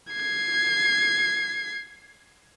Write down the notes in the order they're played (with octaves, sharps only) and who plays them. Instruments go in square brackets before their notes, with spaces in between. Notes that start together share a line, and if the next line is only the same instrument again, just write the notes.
[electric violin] G#6 C7